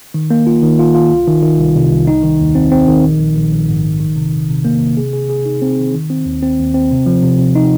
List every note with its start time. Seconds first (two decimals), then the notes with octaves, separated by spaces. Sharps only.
0.14 D#3
0.31 A#3
0.47 F4
0.63 D#3
0.79 F4
0.95 F4
1.11 C2
1.27 D#3
1.42 D#3
1.59 C2
1.76 C3
1.91 C2
2.07 D#4
2.23 D#3
2.40 D#2
2.55 C4
2.72 C4
2.88 D#3
3.04 A#1
3.20 A#1
3.36 A#1
3.53 A#1
3.69 G#2
3.85 A#1
4.00 D#3
4.16 C3
4.32 C3
4.49 C3
4.65 A#3
4.81 C3
4.97 G#4
5.13 G#4
5.30 G#4
5.45 D#4
5.62 C4
5.78 D#3
5.94 D#3
6.10 C4
6.26 D#2
6.43 C4
6.59 D#2
6.74 C4
6.91 C3
7.06 F3
7.23 C3
7.39 C3
7.55 D#4